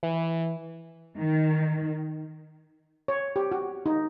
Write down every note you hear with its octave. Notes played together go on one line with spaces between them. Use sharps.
E3
D#3
C#5
G4
F#4
D#4